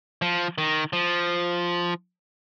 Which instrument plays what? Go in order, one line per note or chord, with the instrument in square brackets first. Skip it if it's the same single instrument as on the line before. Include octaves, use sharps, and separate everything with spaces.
[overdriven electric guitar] F3
D#3
F3